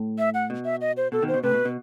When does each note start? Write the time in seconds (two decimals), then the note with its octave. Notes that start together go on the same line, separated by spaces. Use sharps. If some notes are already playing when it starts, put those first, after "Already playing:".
Already playing: A2
0.19 E5
0.34 F#5
0.50 B2
0.65 E5
0.81 D#5
0.97 C5
1.12 B2 A4
1.22 B2 D#3
1.28 C5
1.34 B2
1.43 A2 C3 B4
1.54 B2
1.65 B2